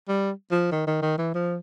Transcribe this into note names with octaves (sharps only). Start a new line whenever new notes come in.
G3
F3
D#3
D#3
D#3
E3
F3